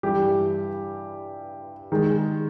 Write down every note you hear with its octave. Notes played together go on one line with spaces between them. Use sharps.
G2 E3 G3 G4
D#3 G#3